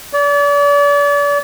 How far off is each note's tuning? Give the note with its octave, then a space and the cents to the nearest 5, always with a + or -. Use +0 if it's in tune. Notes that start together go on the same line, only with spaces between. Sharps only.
D5 -40